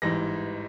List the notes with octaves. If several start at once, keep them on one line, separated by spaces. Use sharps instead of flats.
A1 G#2 E3 G3 A#6